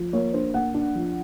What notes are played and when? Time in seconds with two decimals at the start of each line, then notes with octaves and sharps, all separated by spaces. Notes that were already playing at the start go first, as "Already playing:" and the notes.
Already playing: F3
0.13 A#3 C#5
0.33 D4 C5
0.54 A#3 F#5
0.74 D4
0.95 F3